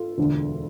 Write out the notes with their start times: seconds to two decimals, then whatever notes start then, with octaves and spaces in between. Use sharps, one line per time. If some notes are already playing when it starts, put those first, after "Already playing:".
Already playing: F4 A4
0.18 E1 D2 D3